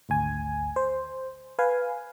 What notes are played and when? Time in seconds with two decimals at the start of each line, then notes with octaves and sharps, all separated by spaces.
0.09 G#1 D2 G#5
0.76 C5
1.59 B4 F5 G#5